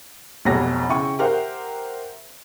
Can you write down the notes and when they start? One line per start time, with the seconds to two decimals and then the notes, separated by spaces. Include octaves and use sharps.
0.45 F1 B1 B2 G4 C#5 A#6
0.89 C#3 E4 G5 C#6
1.19 G4 A#4 C5 E5 F#5 G5